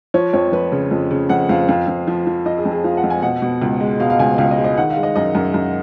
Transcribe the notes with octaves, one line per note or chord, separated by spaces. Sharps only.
F3 C#5
F2 C#5
F3 B4
C#3
F2
C#3
F2 F#5
F2 F5
F2 F5
F2
F3
F3
F3 D#5
G#4
F2
G#4
F3 F5
F#5
F2
G#5
B2 F#5
B2
C#2
G#3
B2 F5
F5
C#2 G#5
C#2 F5
D#5
G#3
D#5
D#3 F#5
F5
G#3
D#5
F#2 D#5
F#2
F#2